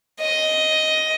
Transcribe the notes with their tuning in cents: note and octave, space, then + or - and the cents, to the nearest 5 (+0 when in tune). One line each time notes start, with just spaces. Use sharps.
D#5 +5